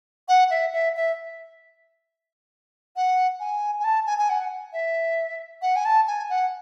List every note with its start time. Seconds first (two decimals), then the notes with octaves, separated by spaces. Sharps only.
0.29 F#5
0.51 E5
0.73 E5
0.96 E5
2.96 F#5
3.40 G#5
3.80 G#5
3.84 A5
4.06 G#5
4.19 G#5
4.30 F#5
4.73 E5
5.62 F#5
5.76 G#5
5.85 A5
6.07 G#5
6.30 F#5